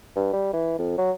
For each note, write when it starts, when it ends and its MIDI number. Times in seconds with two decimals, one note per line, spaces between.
0.16 0.30 43
0.33 0.48 55
0.53 0.74 52
0.79 0.94 41
0.98 1.12 54